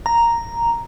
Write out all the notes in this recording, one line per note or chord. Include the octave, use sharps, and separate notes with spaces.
A#5